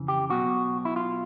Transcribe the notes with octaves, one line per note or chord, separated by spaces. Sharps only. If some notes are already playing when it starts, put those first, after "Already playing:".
Already playing: F2 C#3 E3
G4
B1 B2 F#4
E4
F4